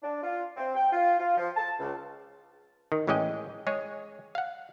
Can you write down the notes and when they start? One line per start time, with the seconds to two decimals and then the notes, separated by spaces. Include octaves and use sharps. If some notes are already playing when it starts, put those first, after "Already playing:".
0.03 D4
0.23 F4
0.57 C4
0.75 G5
0.92 F4
1.20 F4
1.38 F3
1.56 A5
1.80 C#2
2.92 D#3
3.07 A1 E3 G#3 C#4 D#5 G5
3.67 G#3 G#4 C#5
4.35 F5 F#5